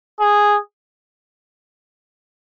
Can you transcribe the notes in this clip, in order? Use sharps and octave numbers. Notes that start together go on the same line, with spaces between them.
G#4